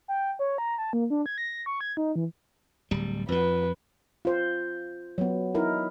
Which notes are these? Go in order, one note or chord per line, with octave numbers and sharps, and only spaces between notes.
G5
C#5
A#5
A5
A#3
D4
G#6
A#6
C#6
G#6
D#4
E3
D1 G3
F2 F3 B4
F4 C5
F#3 B3
D#4 E4 A#4